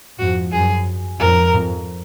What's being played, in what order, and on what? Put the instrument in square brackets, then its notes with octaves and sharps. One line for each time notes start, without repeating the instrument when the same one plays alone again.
[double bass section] F2 G#2 [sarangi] F#4
[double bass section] F#2 [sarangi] G#4
[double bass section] F2 G#2 [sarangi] A#4
[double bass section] F2 G#2